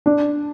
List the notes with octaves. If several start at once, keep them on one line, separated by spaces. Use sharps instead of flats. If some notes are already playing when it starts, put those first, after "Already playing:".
D4